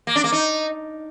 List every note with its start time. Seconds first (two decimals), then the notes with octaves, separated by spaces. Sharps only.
0.07 A#3
0.16 D4
0.24 A#3
0.32 D#4